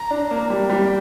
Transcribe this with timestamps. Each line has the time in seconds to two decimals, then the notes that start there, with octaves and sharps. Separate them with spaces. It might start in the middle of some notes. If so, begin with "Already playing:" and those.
Already playing: A#5
0.10 D4
0.31 A#3
0.50 G3 G5
0.70 G3